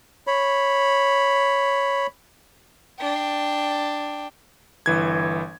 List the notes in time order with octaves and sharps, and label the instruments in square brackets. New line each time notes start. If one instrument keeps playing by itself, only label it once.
[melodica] C#5 B5
[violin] D4 G5
[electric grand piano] G1 E3 G#6